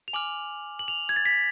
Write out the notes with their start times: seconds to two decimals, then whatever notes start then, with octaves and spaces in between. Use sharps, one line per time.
0.08 F7
0.13 G#5 D6 F6 F#7
0.79 F#7
0.88 F7
1.09 G#6
1.16 A6
1.26 B6